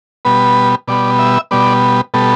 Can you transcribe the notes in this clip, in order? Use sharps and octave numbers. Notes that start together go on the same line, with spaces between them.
B2 G3 B3 B4
B2 G3 B3 D5
E5
B2 G3 B3 D5
B2 G3 B3 A4